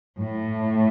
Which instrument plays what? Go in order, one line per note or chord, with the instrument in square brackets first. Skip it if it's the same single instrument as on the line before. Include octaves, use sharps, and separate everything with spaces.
[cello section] A2